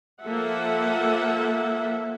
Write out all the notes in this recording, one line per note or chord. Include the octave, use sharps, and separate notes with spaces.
F3 A#3 A4 E5 F#5